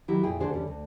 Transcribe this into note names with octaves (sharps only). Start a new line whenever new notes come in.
D#3 F#3 E4 G4
F2 A#2 E4 G#4 G5
D3 F#4 G#4 C5
E2 D3 G3 C#4
D2